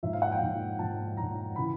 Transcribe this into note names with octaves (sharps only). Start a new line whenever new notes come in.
G#2 F3 E5
F5
F#5
G5
G#2 F3
G#2 F3 A5
F3 A#5
G#2
C#3 E3 B5